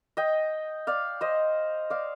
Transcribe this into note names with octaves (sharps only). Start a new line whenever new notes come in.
D#5 G5
D5 F5
C5 D#5
D5 F5